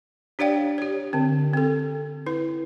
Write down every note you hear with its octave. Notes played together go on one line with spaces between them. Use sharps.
D4 G4 C#5 D5 F5 G5
G4 C#5
D3 C4
C4 A4
E4 B4